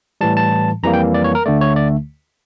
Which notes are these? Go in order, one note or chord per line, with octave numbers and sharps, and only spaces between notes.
A2 E3 G3 A5
A5
F2 E3 G3 A#3 A#5
G5
D5
C#5
A#4
D2 D3 A3 D5
C#5
D5